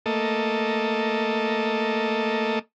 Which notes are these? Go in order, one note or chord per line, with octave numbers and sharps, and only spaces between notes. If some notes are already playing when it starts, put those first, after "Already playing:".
A3 A#3 A4 D#5